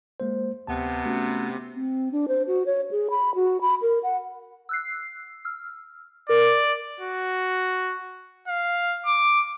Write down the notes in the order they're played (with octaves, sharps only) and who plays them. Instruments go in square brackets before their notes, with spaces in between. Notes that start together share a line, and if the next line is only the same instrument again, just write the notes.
[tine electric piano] G#3 A#3 C5
[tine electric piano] D2 A5 [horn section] C3 B3
[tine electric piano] A3 C#4 F#4
[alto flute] C4
D4
C5
F#4
C#5
G#4
B5
F#4
B5
A#4
F#5
[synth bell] E6 F#6 C7
E6 F6
[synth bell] A#4 [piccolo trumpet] D5
[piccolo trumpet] F#4
F5
D6